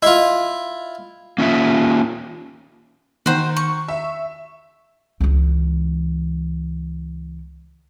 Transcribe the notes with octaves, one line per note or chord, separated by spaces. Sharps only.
E4 F4 D#5
A#3 C#4 F4 E5
D#3 F#4 C5
C#6
E5
C#2 E3